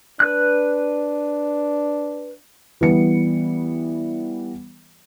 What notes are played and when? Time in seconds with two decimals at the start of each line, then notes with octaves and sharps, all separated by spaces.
0.20 D4 B4 F#6
2.81 E3 G3 B3 C#7